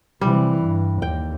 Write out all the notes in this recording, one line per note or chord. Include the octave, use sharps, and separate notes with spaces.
C3 E3 G3
G2
D#2 G5